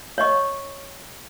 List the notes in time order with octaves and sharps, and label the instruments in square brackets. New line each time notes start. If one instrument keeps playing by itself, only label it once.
[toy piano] C#5 D#5 C#6